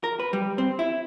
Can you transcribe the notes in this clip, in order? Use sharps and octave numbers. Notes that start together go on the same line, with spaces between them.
A#4
B4
G3
C4
E4